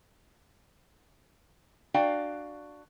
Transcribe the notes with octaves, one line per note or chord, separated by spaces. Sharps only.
D4 F#4 D5 F5 G5